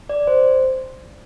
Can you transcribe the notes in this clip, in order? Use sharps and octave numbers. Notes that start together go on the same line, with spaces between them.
D5
C5